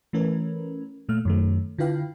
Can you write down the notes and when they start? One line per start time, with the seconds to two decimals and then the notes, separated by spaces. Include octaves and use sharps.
0.13 E3 A3 C#4 A#4 B4
1.09 A#2 A3 F6
1.25 F#2 D#3 A3
1.78 D3 E4 F4 B4 F5 G5